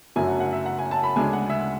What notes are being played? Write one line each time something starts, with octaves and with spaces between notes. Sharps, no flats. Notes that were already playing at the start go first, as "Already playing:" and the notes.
F#1 F#2 D3 F#3 A3 G#5
F#5
F#5
E5
F#5
G#5
A5
B5
D2 C#3 G#3 D4 G#5
F#5
E5